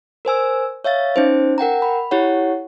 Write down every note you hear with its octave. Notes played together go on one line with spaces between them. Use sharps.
A#4 C5 G#5 E6
C#5 E5 F5 A6
C#4 D#4 C5
A#4 F#5 G5 A#5
B5
E4 G4 C#5 F#5